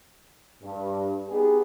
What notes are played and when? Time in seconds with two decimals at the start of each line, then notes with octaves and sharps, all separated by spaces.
0.62 G2
1.29 B3 D#4 G4 G#4